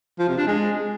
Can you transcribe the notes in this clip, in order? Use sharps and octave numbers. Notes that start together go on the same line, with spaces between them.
F3
C3
D4
G#3